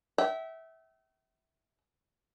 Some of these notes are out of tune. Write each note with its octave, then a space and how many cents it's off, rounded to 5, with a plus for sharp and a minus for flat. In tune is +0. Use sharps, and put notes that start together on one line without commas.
E5 -15 G5 -40